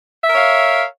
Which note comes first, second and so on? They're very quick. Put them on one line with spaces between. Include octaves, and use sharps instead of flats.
E5 A#4 C#5 F5